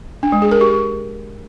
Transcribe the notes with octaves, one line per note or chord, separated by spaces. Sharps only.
D4
G#3
G#4
A#4
G4